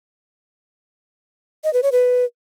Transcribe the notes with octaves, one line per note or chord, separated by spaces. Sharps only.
D#5
B4
C#5
B4